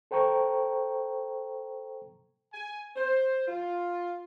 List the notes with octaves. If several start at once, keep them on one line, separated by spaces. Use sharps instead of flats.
A4 C5 G5 A#5 C#6
G#5
C5
F4